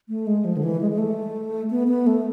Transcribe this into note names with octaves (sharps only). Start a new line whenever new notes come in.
A3
G#3
F3
D3
E3
G#3
G#3
A3
B3
B3
A3